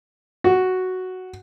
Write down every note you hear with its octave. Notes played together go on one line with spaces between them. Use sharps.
F#4